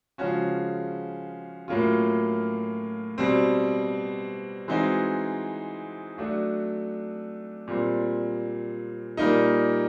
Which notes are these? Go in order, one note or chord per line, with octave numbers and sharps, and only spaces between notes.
C#3 F3 G#3 C#4 F#4
A2 F#3 A#3 C#4 F4
B2 G3 C4
E3 G#3 C4 D#4 F#4
F#3 A3 D4 F#4
A#2 G3 C4
A#2 G3 A#3 D#4